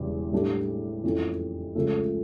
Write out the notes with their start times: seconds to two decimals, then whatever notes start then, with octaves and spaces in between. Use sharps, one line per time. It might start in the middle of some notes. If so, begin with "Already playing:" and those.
Already playing: E1 E2 C#3 G3
0.32 A2 G3 D4 A4
1.04 F2 E3 A3 C#4
1.75 C#2 C#3 F3 A3